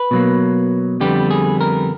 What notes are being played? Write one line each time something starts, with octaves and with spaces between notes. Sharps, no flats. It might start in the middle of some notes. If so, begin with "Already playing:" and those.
Already playing: B4
B2 F#3 A#3
F2 D3 G3 B3 G4
G#4
A#4